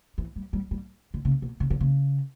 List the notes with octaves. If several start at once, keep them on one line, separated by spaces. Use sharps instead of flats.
E3
G3
G3
G3
D3
C#3
B2
C#3
D3
C#3